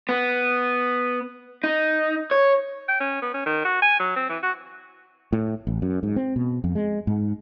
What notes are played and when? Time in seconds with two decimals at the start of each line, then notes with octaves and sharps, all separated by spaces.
0.09 B3
1.64 D#4
2.31 C#5
2.88 G5
3.00 C#4
3.22 B3
3.34 C#4
3.46 D#3
3.65 F#4
3.82 G#5
4.00 F#3
4.16 C4
4.29 E3
4.43 F#4
5.33 A2
5.67 A1
5.82 F#2
6.03 G#2
6.16 C4
6.36 B2
6.64 F2
6.75 G#3
7.07 G#2